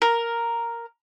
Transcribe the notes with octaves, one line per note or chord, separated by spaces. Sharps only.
A#4